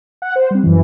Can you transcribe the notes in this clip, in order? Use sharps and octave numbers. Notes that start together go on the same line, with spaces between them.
F#5
C5
G3 C4
F#2 E3